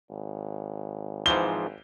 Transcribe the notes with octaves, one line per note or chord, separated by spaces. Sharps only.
G#1
G#2 E3 F3 G7